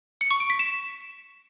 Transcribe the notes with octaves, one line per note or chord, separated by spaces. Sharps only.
C#7
C#6
D7
B6
E7